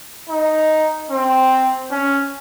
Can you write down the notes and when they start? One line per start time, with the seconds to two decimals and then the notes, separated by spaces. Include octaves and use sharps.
0.29 D#4
1.11 C4
1.91 C#4